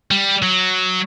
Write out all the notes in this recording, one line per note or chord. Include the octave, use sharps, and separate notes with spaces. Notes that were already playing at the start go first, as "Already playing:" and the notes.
G3
F#3